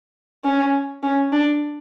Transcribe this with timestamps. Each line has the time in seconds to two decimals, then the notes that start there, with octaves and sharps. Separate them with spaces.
0.44 C#4
1.03 C#4
1.32 D4